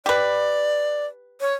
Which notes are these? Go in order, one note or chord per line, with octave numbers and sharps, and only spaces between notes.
G4 B4 D5
C#5